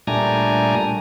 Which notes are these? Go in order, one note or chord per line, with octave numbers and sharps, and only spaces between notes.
A#2 G3 A3 D4 G#5 A#5